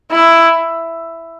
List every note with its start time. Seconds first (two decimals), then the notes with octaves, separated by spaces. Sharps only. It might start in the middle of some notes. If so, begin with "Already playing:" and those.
0.11 E4